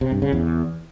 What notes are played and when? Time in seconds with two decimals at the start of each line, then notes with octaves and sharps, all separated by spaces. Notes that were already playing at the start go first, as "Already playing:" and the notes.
0.01 C3
0.12 G2
0.22 C#3
0.32 E2